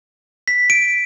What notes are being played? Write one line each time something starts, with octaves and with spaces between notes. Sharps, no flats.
B6
D7